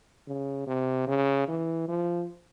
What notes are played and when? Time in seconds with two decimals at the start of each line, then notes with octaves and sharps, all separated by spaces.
0.27 C#3
0.67 C3
1.07 C#3
1.48 E3
1.88 F3